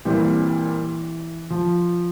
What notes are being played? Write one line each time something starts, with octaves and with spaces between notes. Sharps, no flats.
A#2 E3 G3 C4
F3